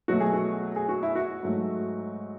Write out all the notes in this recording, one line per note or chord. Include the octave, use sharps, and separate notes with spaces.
B2 F#3 A3 F#4
G#4
F#4
G#4
F#4
E4
F#4
G#2 F#3 A3